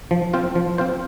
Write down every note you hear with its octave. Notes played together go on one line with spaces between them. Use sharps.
F3
C4 F4 C5
F3
C4 F4 C5